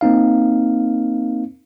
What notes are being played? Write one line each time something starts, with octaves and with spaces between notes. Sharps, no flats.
A#3 C4 D#4 F5